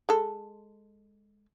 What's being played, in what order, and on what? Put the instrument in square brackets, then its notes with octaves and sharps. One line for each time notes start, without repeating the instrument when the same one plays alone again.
[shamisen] G#3 A4